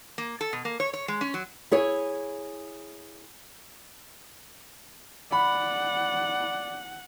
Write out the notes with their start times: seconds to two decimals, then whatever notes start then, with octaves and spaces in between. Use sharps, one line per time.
0.18 A#3
0.41 A4
0.53 B2
0.65 A#3
0.80 C#5
0.93 C#5
1.08 G#3
1.21 C#4
1.34 F#3
1.71 E4 G#4 C#5
5.32 D5 F#5 B5